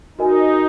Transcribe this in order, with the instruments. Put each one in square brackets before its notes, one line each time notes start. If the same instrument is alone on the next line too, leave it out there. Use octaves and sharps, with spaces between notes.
[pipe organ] D#4 [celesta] F#4 A#4 D#5 G#5